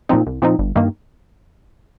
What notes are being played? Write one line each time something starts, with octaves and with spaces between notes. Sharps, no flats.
A#2 F3 C4 D#4
C2
A#2 F3 C4 D#4
G1
G2 D#3 A#3